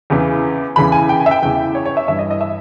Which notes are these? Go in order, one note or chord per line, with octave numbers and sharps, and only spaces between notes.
E2 C#3 E3
E2 C#3 E3 B5
G#5
G5
G#5
E5
G5
E2 C#3 E3 G5
C#5
C#5
E5
G2 E3 E5
D#5
D#5
E5